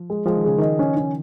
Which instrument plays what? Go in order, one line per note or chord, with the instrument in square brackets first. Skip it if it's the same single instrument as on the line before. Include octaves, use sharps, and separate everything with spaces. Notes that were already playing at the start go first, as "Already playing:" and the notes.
Already playing: [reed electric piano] F3
[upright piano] G#3
[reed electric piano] F3 [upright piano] G#3
[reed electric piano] D#3
[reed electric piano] C#3 [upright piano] G#4
[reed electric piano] D#3 [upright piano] D#5
[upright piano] C#4
C#4